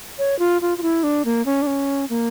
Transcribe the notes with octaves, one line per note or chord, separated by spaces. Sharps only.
C#5
F4
F4
F4
E4
D4
A#3
C#4
D4
C#4
A#3